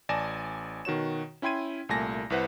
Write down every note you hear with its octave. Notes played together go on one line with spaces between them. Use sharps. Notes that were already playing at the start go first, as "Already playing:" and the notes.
A1 D5 G#5 A5 A#6 E7
B2 D#3 F#4 C#5 E7
C#4 E4 G5 C6 G#6 D#7
C2 A#2 A3 G#5 A5 A#6
C2 E4 B4 C5 F#5